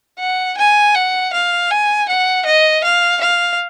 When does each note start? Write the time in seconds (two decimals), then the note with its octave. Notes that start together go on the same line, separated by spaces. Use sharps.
0.20 F#5
0.58 G#5
0.95 F#5
1.33 F5
1.70 G#5
2.08 F#5
2.46 D#5
2.84 F5
3.21 F5